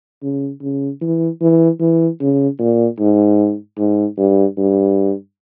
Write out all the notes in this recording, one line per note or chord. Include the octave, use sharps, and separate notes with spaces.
C#3
C#3
E3
E3
E3
C#3
A#2
G#2
G#2
G2
G2